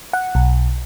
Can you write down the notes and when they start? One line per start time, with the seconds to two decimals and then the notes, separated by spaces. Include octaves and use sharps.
0.13 F#5
0.35 B1